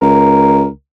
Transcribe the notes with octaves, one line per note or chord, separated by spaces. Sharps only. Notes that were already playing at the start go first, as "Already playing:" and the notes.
C#2 A#4